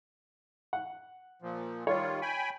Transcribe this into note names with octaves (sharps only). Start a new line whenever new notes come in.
F#5
A#2 F3
D#3 G3 F4 C#5
G5 G#5 B5